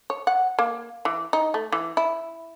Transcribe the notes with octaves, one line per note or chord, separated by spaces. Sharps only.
C#5
F#5
A#3
E3
D#4
A3
E3
E4